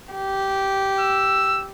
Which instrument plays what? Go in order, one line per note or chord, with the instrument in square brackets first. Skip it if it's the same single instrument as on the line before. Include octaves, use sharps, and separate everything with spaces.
[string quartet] G4
[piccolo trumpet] E6